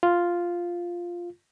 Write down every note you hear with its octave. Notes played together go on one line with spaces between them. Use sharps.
F4